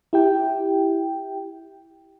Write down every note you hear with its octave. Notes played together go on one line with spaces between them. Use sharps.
E4 G4 G5